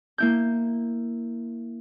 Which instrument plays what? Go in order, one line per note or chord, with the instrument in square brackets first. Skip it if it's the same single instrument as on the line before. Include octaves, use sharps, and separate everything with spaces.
[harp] A#3 E4 G6